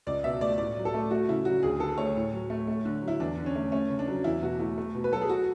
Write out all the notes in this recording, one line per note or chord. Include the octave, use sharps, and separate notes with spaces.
C#2 D5
B2 E5
A3 D5
A2 D5
F#3
A4
A3
A3 F#4
C#3 E4
F#3 F#4
D2 G#4
D3 A4
A3 C#5
A2
F#3
A3
A3
D3
F#3
E4
E2 D4
D3
C#4
A3
A3 C#4
C#3
D4
F#3
E2 E4
B2 F#4
A3 E4
A3
B2
B4
F#3 A4
G#4
F#4